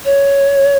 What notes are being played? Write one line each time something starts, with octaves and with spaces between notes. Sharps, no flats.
C#5